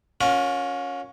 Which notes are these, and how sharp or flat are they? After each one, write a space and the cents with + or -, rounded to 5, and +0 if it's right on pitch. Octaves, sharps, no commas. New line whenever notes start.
C#4 +5 F4 +45 A#4 +30